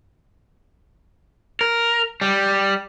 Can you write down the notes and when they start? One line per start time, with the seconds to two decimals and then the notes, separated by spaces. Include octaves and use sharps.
1.61 A#4
2.21 G3